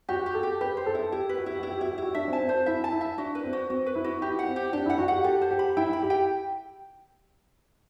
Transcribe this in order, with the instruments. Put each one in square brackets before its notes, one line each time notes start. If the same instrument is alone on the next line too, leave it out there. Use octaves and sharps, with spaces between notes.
[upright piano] F#4 [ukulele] G4
[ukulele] G4
[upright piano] A4
[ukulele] G4
[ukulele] G4 [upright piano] B4
[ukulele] C5
[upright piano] A4
[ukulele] E4
[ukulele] E4 [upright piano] G4
[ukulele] B4
[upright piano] F#4
[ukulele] E4 [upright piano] G4
[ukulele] E4 [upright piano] F#4
[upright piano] G4
[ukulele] E4 [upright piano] F#4
[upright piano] G4
[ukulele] E4 [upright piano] F#4
[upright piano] D4 [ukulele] E5
[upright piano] C4
[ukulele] A5
[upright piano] C4
[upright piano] F#4 [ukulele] C5
[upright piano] E4 [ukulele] E5
[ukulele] A5
[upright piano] E4
[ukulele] E5
[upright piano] D4 [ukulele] F#4
[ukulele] B4
[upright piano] C4
[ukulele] F#4
[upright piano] C4 [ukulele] F#4
[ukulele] B4
[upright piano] E4
[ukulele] F#4
[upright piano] E4 [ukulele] G4
[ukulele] F#5
[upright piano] C4
[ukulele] G4
[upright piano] D4 [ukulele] G4
[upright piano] E4 [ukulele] F#5
[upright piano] F#4
[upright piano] G4 [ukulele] F#5
[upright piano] G4 [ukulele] A4
[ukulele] C5
[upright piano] G4
[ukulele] B5
[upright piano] E4 [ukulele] G5
[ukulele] B5
[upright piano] G4
[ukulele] G5